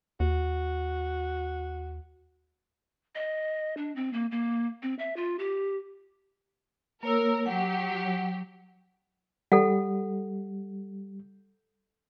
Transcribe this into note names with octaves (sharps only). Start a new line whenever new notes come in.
D#2 F#4
D#5
D4
C4
A#3
A#3
C4
E5
F4
G4
A#3 A#4 C#5 E6
F#3 G4 F#5
G3 A4 F#5